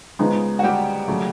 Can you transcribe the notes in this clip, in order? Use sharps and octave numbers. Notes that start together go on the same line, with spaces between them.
C#3 F3 G#3 B3 D#4
F#4
G3 G4
C#3 F#3 A3